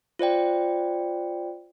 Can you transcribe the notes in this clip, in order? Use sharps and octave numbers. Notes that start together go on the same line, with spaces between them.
F4 C5 D5 G5